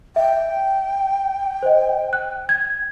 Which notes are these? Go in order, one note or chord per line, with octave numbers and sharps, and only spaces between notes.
E5 G5
C5 D#5
F#6
G#6